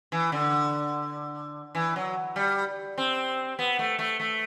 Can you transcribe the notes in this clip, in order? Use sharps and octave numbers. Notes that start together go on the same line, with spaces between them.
E3
D3
E3
F#3
G3
C4
B3
A3
A3
A3